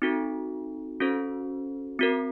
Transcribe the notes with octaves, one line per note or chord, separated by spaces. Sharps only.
C4 D#4 F#4 A4
C#4 F#4 A4 C5
C4 F#4 A#4